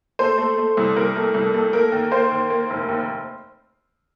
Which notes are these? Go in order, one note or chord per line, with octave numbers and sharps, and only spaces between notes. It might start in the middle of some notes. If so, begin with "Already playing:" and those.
A3 C5
A3
A3
C2
C2 A#4
A3
C2
A3
A#3 A#4
D#2
A#3 C5
D#2
A#3
F1
D#2